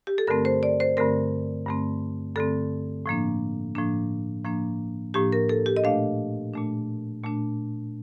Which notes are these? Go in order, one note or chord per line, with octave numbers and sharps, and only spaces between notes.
G4
A4
G2 D3 A3 C4 A#4
C5
D5
C5
G2 D3 A3 C4 A#4
G2 D3 A3 C4
G2 D3 A3 C4 A4
A2 F3 A#3 D4
A2 F3 A#3 D4
A2 F3 A#3 D4
A2 F3 A#3 D4 G4
A#4
A4
G4
D#5
A#2 A3 D4 F5
A#2 A3 D4
A#2 A3 D4